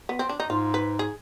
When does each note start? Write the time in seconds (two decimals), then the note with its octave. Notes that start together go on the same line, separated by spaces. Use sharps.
0.09 B3
0.19 C4
0.29 D4
0.40 D#4
0.50 G#2 F4
0.74 B4
0.99 G#4